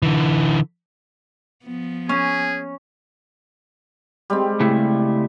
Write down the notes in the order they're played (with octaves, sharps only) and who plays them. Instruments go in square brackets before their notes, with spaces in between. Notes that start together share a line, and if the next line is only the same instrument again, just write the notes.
[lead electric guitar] D3 E3
[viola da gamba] F3 B3
[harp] C#4 [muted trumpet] G#4
[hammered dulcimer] G3 G#3 C4
[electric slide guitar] C#3 A3 E4